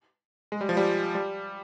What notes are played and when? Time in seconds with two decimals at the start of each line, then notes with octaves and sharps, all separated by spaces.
0.52 G#3
0.61 G3
0.69 F3
0.77 G3
1.15 G3